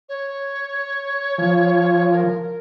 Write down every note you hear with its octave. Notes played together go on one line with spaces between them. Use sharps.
C#5
F3
A#4